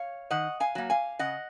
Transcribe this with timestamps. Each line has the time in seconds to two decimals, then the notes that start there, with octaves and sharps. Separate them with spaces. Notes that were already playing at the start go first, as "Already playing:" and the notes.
Already playing: C#5 F5
0.31 D#3 D#5 F#5
0.60 F5 G#5
0.75 F#3 A#3
0.90 F5 G#5
1.19 C#3 D#5 F#5